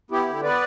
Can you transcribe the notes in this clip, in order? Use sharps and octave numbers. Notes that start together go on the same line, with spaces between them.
B3 E4 G4
D3
B3 B4 D5